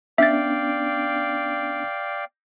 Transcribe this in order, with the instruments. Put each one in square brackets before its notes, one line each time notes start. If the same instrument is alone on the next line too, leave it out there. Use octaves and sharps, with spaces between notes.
[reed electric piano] B3 C#4 D4 [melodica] D5 F5 G5 [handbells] E5 A6